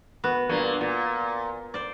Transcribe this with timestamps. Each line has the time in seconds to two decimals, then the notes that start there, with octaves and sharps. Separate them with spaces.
0.24 B3 F#4
0.49 G2 A#2 A#3
0.81 A#2
1.74 C5 D5